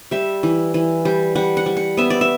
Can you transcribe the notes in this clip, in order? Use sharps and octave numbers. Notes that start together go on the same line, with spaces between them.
G3 E5
E3
E3
G3
G3 F#5
F#5
G3
F#5
B3 E5
D5
E5